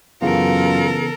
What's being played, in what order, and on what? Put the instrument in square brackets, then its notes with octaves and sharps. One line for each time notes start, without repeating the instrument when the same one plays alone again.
[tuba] F#2 [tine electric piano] C#3 E3 B3 [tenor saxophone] F4 [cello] A4 A#4